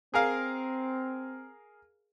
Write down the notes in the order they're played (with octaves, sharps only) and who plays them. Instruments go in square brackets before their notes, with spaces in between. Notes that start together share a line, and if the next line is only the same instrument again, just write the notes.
[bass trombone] C4 [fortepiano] G#4 A#4 F5